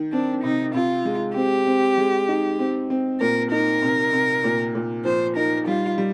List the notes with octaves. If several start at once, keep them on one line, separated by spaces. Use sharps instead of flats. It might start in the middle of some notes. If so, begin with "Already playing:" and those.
Already playing: D#3
C4 D4
C3 D#4
C3 F4
G#3
C4 G4
C4
G#3
D#4
C4
C4
A#2 A#4
D#4 A#4
C3
C3
A#2
A#2
F3 C5
D#4 A#4
G3 F4
G3